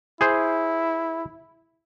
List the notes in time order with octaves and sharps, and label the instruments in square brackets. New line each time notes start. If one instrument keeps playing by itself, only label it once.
[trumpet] E4 [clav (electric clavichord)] G#4 C5